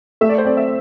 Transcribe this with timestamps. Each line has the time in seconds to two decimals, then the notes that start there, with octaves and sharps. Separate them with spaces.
0.21 A3 E5
0.29 D5
0.38 C5
0.45 C4 D5
0.57 E5